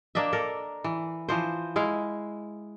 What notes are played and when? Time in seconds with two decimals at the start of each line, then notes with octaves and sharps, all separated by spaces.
0.15 A#3 D4 D#5 E5
0.33 A4 A#4
0.84 E3
1.29 E3 F3 C5
1.76 G#3 E4 F5